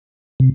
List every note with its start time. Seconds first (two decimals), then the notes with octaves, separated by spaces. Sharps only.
0.40 C3